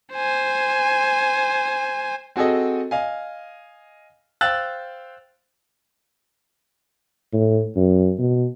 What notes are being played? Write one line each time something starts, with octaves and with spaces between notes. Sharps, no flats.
C5 G#5
C4 F#4 G#4 A4 D#5
D#5 F5 G#5
C5 F5 G5 E6 F#6 A6
A2
F#2
B2